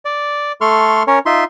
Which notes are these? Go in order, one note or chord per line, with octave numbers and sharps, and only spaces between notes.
D5
A3 A4 C6 C#6 F6
C#4 A#4 C#5
D#4 F4 E5 C6